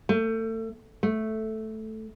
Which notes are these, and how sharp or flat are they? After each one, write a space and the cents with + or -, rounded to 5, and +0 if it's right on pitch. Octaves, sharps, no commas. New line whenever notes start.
A3 +30
A3 -5